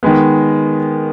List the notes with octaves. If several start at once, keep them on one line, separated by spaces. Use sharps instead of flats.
D#3 G#3 B3